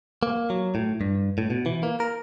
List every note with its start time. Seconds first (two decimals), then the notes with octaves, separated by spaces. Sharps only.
0.23 A#3
0.50 F#3
0.75 A2
1.01 G2
1.38 A2
1.50 B2
1.66 E3
1.83 A#3
2.00 A#4